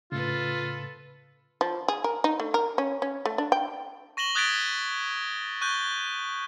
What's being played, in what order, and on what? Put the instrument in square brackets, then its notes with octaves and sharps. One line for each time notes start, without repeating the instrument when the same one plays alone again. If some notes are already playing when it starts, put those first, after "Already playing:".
[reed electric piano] A2 C#3 [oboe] F4 [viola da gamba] A4 B4
[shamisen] F3
G#4
A#4
D#4
A3
A#4
C#4
C#4
A3
D4
G5
[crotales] C#6 A#6 E7 F#7 G7
D#6 F#6 G#6 A6 B6 D7
C#6 F#6 G6 G7